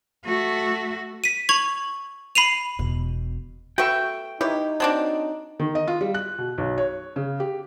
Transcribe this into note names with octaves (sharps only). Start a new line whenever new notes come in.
A3 F#4
B6 D#7
C#6 G#6 F7 F#7
B5 C7 D#7 F7
E1 B2
A3 F#4 B4 G5 C#6 E6
D#4 E4 G4 B4 C#5
F#3 C4 D4 A5 D6
D#3
D#5
F4
G3
F#6
B2
B1
C#5
C#3
G4